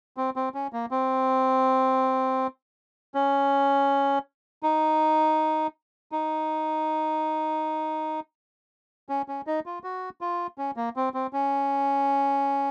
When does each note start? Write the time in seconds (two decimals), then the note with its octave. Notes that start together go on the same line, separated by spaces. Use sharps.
0.17 C4
0.36 C4
0.54 C#4
0.73 A#3
0.91 C4
3.15 C#4
4.63 D#4
6.12 D#4
9.09 C#4
9.28 C#4
9.47 D#4
9.66 F4
9.84 F#4
10.21 F4
10.58 C#4
10.76 A#3
10.96 C4
11.14 C4
11.33 C#4